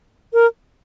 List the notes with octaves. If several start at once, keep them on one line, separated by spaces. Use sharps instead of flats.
A#4